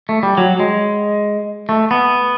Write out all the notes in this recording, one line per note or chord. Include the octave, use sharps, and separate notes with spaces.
A3
G3
F#3
G#3
A3
B3